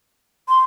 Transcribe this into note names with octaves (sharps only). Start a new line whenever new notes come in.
C6